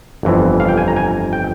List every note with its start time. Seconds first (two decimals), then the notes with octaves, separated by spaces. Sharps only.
0.23 G1 F2 E3
0.60 F5
0.69 G5
0.78 G#5
0.88 A#5
0.97 G#5
1.33 G5